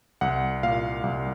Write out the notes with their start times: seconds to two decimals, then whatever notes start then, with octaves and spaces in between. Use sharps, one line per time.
0.21 C2 F#5
0.63 A#2 F5
1.03 C2